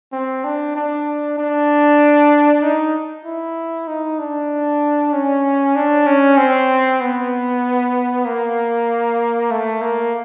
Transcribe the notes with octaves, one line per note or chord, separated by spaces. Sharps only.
C4
D4
D4
D4
D#4
E4
D#4
D4
C#4
D4
C#4
C4
B3
A#3
A3
A#3